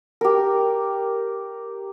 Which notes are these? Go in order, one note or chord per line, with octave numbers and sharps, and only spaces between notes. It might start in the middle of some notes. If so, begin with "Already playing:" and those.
G4 A#4